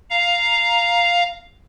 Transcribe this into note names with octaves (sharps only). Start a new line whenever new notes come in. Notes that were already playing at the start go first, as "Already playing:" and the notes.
F5 A#5